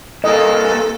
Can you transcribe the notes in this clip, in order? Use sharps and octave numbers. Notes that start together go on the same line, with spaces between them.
C2 A#3 A4 D#5